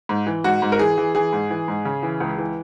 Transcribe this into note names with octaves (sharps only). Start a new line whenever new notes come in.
G#2
E3
G#2 F#4
G#2
A#4
E3 G#4
E3
E3 G#4
G#2
E3
G#2
C#3
E3
C#2
E3